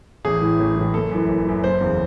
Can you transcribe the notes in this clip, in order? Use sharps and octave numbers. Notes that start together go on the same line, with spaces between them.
A1 G#4
A2 E3
A1
A2 E3
F#1 A4
F#2 E3
F#1
F#2 E3
F#1 C5
E2 C#3